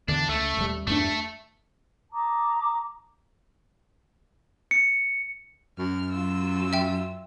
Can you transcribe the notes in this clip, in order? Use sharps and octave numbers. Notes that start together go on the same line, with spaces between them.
E2 D3 E3 D4
C#2 A3
D#1 G3
E2 G2 A3 D4
A5 A#5 D6 D#6
C#7
F#2 F6
F#3 F4 E6
E5 G5